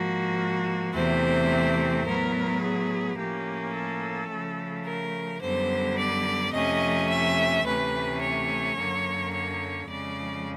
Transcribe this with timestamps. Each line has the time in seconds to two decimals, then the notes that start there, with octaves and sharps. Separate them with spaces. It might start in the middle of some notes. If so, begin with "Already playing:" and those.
Already playing: G#2 F3 A#3 F#4
0.93 E2 C3 E3 A3 C4 C5
2.05 A2 F#3 B3 A#4
2.62 G#4
3.17 A2 F3 A#3 C#4 G4
3.74 A4
4.29 C#3 F3 A3
4.85 A#4
5.41 F#2 D3 G3 B3 C5
5.97 D5
6.53 F2 C3 F3 A3 C#4 D#5
7.08 E5
7.65 D2 C3 E3 A3 C#4 B4
8.21 C#5
8.76 F#2 D3 F#3 A#3
9.33 C#5
9.88 F2 C#3 F3 G#3 D5